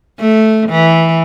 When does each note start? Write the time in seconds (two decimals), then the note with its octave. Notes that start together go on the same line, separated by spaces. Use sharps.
0.20 A3
0.69 E3